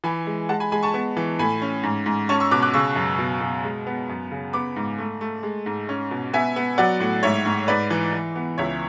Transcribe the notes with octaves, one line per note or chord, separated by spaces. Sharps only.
E3 G#5 B5
G#3
G#3 F#5 A5
G#5 B5
G#3 G#5 B5
A5 C#6
B3
E3
A2 G#5 B5
C#4
G#2
G#2
C#4 A5 C#6
C#6 E6
B2 D6 F#6
D6 F#6
C#3 C#6 E6
F#2
B2
B2
G#3
B3
F#2
C#3
B3 B5 D6
G#2
A3
A3
G#3
G#2
C#4
B2
B3 E5 G#5
B3
F#3 D5 F#5
A2
G#2 C#5 E5
G#2
G#2 B4 D5
E3
E3
B3
C#2 C#5 E5